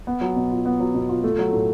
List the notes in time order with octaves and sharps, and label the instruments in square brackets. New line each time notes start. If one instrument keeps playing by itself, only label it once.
[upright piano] B3
F#3
B2
F4
B3
F#3
B2
F4
A3
F#3
A2